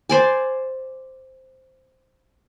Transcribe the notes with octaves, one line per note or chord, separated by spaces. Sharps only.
C5 D5 G#5